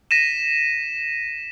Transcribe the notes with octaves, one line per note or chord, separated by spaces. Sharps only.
A#6 B6 D#7 E7